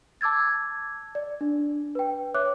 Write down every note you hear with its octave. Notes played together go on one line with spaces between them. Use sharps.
A5 D6 E6 G#6 A6
D5
D4
B4 G5
C#5 E5 D6 F#6